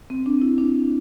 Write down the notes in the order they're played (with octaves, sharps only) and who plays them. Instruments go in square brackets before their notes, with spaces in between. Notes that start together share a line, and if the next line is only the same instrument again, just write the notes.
[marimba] C4
D4
E4
D4